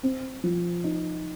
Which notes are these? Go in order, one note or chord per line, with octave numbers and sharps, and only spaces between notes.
C4
F3
D#4